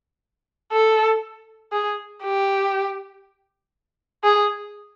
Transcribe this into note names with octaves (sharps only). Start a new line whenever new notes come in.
A4
G#4
G4
G#4